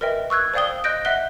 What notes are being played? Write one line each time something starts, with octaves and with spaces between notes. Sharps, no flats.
A#4 B4 D#5 E5 G5
C#6 E6 F#6 G#6
C5 D5 F5 G5 D#6 G7
D#5 F#6 G6 A#6 D7
D#5 E5 F#5 F#6 G7